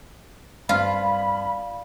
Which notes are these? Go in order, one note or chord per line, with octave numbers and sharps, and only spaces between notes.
G2 C4 F4 D5 F5 B5